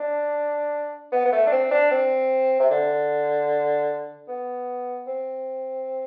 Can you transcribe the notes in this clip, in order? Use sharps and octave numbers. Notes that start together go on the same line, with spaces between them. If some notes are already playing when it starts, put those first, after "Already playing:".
Already playing: D4
B3
B3
A3
D4
C4
D4
C4
C3
D3
B3
C4